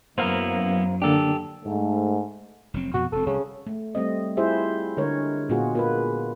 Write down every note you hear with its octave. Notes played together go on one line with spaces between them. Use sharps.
F#2 A#3 B3 E4 C5 F5 A#5
D3 A#3 D4 G4 A4
G#2 A3
F1 F#3 C4
F2 B2 F#4
E1 C4 A4
C2 C#3
A3
G3 A3 C4 D#5
E4 F4 G4 G#4 C5 E5
D3 G#3 A#4 C#5
A#2 G#3 B3 F4 F#4 G#4
A#3 F4 B4